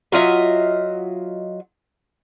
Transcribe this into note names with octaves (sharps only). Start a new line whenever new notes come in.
F#3 F4 D#5 E5